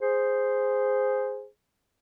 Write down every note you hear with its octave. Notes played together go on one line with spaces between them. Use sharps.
G#4 C5